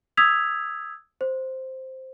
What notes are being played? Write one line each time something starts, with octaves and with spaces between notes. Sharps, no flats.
D#6 E6 G#6 B6 F7
C5